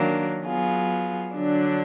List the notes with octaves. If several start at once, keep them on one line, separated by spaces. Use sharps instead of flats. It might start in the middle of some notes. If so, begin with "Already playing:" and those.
Already playing: D#3 F#3 A#3 D4
F#3 B3 F4 G#4
D3 F#3 D4